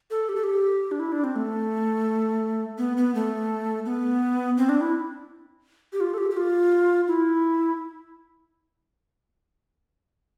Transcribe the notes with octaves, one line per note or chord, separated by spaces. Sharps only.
A4
G4
A4
G4
D4
E4
D4
C4
A3
B3
B3
A3
B3
C4
D4
E4
G4
F4
A4
G4
G4
F4
E4